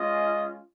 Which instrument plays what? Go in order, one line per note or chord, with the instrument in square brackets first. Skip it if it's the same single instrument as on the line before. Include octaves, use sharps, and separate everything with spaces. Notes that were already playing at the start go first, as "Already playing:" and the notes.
Already playing: [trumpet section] G#3 C#4 F4 D#5